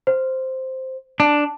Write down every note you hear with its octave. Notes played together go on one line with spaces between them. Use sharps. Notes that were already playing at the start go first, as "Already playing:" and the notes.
C5
D4 A5